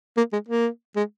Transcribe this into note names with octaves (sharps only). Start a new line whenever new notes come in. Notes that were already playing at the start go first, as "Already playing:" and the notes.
A#3
G#3
A#3
G#3